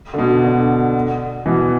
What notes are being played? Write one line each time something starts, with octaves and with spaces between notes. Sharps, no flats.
D3
B2
D3
B2 E3